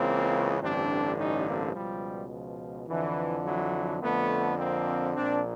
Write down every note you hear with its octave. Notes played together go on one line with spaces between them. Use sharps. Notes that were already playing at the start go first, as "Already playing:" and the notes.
Already playing: C#2 C#3 E3 A#3 C4
A1 G2 D3 C4 D4
C#4 D#4
A#3 C4
C#2 B2 F3 G3
F3
F2 D3 E3
E3 F#3
F2 D3 A3 B3
A#3 C4
A#1 A#2 C4 D4